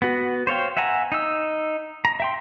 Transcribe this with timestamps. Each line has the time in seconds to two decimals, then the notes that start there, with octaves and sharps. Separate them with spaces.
0.02 B3 F#4
0.47 C5 C#5 F5 G5
0.77 E5 F#5 G#5 A#5
1.12 D#4 E6
2.05 A#5
2.20 E5 G5 C6